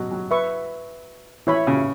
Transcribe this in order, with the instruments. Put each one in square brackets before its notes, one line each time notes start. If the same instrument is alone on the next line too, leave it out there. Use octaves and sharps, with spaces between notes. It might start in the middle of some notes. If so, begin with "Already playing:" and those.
Already playing: [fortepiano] B2 F#3
F#3
[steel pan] B4 E5 C#6
[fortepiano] E3 [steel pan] E4 C#5 E5 B5
[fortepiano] C#3